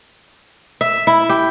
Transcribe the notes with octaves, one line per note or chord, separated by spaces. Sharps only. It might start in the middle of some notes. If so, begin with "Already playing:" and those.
E5
E4
G4